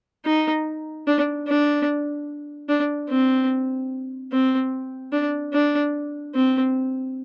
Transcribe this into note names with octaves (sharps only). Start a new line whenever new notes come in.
D#4
D4
D4
D4
C4
C4
D4
D4
C4